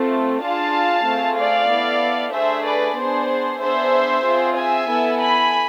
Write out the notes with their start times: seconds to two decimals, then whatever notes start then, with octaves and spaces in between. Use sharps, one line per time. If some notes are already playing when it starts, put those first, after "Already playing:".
Already playing: A3 C4 F4 A4
0.42 D4 F4 G#4 F5 A5
1.06 A3 C4 F4 G#4
1.38 D5 F5
1.70 B3 E4 A4
2.33 A3 D4 G#4 C5 E5
2.65 B4 D5
2.97 B3 D4 G#4 C5
3.61 B3 D4 G#4 C5 E5
4.25 C4 F4 G#4
4.57 E5 G#5
4.88 B3 E4 A4
5.20 G#5 B5